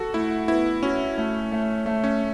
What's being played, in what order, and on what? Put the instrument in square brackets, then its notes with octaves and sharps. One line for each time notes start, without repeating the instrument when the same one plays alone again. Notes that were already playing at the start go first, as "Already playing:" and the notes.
Already playing: [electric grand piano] F#4 [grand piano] A4
[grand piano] A3 [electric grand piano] E4
[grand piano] B3 [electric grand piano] E4
[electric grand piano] C#4 [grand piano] F#4
[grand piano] A3
A3
A3
[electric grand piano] C#4